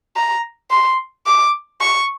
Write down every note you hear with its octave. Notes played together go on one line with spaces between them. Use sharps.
A#5
C6
D6
C#6